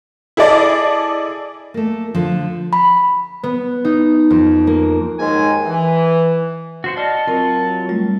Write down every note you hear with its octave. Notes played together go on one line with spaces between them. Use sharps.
E4 G#4 A4 D5 D#5
A3 A#3
D3 F3
B5
B3
D#4
F2
A#3
D#2 G#2 D#3 G#3 G#5
E3
F#4 C5 F#5
D5 D#5 F#5 A5 F6
F#3 C4 F4 A#4
G3 A3 F4